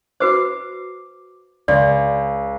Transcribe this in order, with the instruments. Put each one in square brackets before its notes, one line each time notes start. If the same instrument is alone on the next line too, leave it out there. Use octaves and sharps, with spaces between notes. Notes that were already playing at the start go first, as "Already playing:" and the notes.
[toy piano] F#4 B4 C5 [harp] D6 C7
[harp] C#2 [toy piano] D5